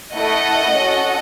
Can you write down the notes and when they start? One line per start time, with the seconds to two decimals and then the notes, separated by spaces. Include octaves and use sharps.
0.17 A3 E4 A4 D#5 F#5
0.75 C#4 F#4 A4